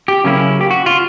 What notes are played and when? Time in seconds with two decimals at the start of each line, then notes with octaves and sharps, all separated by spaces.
0.08 G4
0.24 C#3 F#3 A#3 C#4 E4
0.61 G4
0.71 F#4
0.86 F4